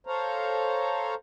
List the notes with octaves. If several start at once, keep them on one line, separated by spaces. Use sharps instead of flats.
A4 C5 C#5 F5 A#5